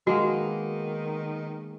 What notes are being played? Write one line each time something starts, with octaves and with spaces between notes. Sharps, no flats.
D#3 G#3 A#3 B3 F#4